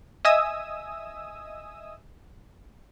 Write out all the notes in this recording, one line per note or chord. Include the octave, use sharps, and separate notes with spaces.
D#5 E5 G#5 D#6 E6